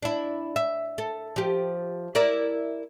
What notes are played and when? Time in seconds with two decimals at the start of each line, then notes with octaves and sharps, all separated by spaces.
0.02 D4 E4
0.56 E5
0.98 A4
1.36 F3 G4
2.15 E4 A#4 D5